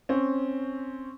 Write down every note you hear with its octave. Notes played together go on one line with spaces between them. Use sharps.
C4 C#4